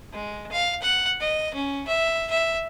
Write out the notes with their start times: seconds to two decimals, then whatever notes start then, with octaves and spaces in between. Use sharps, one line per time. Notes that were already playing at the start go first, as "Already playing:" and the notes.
0.13 G#3
0.52 F5
0.82 F#5
1.21 D#5
1.54 C#4
1.87 E5
2.31 E5